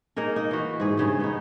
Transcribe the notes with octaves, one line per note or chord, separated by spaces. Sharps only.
A#3 D#4 G#4 A#4
D#4
E3 F#4
G#2 G#4
G2 C#3 G#4
B3 D#4